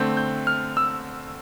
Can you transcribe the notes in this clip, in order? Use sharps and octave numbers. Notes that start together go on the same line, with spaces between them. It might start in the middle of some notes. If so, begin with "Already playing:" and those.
Already playing: D3 A3 C4 G6
G6
F6
E6